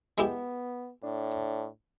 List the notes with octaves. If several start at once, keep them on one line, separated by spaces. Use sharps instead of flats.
G#3 B3 E4 G4
A2 D4